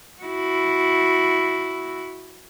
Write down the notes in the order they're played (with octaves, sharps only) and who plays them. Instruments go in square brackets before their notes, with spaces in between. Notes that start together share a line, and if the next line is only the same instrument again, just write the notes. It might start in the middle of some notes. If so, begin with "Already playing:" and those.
[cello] E4 F#4